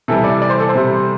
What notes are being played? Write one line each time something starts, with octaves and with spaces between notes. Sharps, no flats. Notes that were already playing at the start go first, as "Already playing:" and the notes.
C3 E3 G3 A4
D5
D5
C5
A4
C5
C3 G3